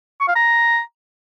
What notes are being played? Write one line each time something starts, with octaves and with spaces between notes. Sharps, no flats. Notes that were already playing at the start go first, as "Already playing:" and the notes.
C#6
F5
A#5